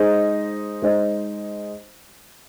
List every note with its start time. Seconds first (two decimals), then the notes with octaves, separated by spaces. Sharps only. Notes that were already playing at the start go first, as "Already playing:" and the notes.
Already playing: G#3 D#4 G#4 C5 D#5
0.82 G#3 D#4 G#4 C5 D#5